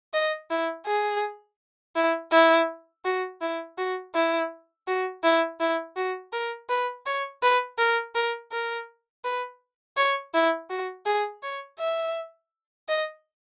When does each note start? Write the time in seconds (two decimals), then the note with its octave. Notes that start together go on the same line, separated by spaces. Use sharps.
0.13 D#5
0.50 E4
0.86 G#4
1.96 E4
2.32 E4
3.05 F#4
3.41 E4
3.78 F#4
4.14 E4
4.87 F#4
5.24 E4
5.60 E4
5.96 F#4
6.32 A#4
6.69 B4
7.06 C#5
7.42 B4
7.78 A#4
8.15 A#4
8.52 A#4
9.24 B4
9.97 C#5
10.34 E4
10.70 F#4
11.06 G#4
11.43 C#5
11.79 E5
12.88 D#5